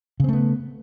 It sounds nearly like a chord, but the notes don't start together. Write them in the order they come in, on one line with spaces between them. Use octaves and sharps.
C#3 C4 A3 B3